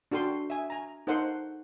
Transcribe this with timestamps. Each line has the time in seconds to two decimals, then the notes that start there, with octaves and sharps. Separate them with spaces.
0.11 D4 F#4 A4 G5 C6
0.50 E5 G#5
0.70 G#5 A#5
1.07 D#4 A4 A#4 C5 F#5 C6